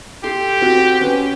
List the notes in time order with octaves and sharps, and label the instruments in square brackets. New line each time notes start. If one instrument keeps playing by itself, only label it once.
[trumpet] G4 [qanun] A4 C6
[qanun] C4 F#4
C#4 B4